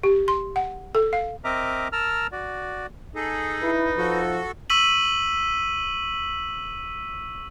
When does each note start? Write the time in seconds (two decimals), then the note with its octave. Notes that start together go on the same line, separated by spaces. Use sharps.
0.03 G4
0.28 C6
0.56 F#5
0.95 A4
1.13 F5
1.44 C4 A#4 D#5 E5 A#5 D6
1.92 A#4 A5 A#5 E6 F6
2.32 F#4 D5
3.15 D#4 G#4 A4
3.63 E4 B4
3.97 F3 F#4 A4
4.70 C#6 E6 B6 D#7 F#7